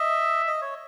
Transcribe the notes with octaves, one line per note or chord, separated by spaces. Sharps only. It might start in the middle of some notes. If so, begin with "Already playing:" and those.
Already playing: D#5 E5
D#5
C#5